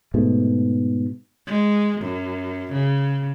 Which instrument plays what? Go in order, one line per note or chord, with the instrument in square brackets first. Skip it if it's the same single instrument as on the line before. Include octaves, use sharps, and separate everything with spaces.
[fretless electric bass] G#2 B2 A3
[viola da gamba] G#3
F#2
C#3